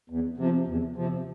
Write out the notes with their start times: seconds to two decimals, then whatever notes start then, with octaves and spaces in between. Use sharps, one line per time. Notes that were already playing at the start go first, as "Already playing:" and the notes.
0.10 E2
0.37 C3 F3
0.67 E2
0.96 C3 F3